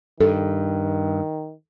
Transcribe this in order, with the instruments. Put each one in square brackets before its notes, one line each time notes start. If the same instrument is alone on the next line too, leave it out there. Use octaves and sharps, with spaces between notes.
[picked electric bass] G2 [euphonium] D#3 [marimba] A4